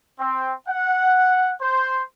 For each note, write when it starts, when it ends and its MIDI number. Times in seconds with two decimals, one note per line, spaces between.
0.19 0.52 60
0.68 1.53 78
1.61 2.01 72